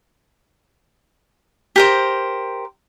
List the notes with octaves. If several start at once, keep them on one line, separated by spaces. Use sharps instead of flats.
G4 A#4 C5